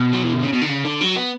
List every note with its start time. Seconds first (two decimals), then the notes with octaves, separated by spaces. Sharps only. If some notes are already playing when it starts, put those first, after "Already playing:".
Already playing: B2
0.13 F#3
0.23 E3
0.33 D3
0.42 C#3
0.53 B2
0.61 D3
0.69 C#3
0.84 D3
1.01 F#3
1.16 B3